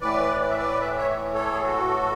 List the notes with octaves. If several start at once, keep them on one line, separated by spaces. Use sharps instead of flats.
A2 E3 B4 D5
D5
E5
B4 D5
E5
C#5 E5
A4 C#5
G#4
F#4 A4